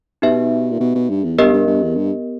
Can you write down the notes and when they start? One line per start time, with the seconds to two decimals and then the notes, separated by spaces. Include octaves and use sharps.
0.22 B2 D#4 G4 B4 E5
0.71 A#2
0.80 B2
0.95 B2
1.10 G2
1.24 E2
1.39 G2 B3 G4 A#4 D#5
1.53 G2
1.67 G2
1.82 E2
1.96 G2